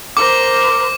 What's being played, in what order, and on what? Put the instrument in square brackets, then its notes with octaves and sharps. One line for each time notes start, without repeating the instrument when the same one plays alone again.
[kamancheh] A#4 C5 [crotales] D6